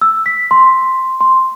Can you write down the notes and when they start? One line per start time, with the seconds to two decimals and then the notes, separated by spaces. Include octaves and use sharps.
0.01 E6
0.26 B6
0.51 C6
1.21 C6